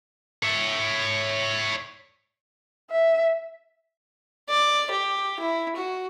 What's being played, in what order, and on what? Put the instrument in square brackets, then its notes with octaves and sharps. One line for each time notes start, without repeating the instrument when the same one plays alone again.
[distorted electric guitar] C#5 E5
[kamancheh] E5
[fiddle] D5
G4
E4
F#4